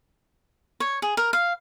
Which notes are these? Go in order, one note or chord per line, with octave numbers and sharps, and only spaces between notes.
C#5
G#4
A#4
F5